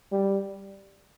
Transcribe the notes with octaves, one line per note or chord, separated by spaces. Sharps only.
G3